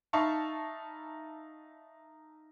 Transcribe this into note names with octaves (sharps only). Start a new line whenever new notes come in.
D#4 E5 F5 A5 B5 C#6